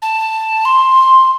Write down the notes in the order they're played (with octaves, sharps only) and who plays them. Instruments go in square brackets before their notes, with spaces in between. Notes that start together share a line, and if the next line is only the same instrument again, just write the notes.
[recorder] A5
C6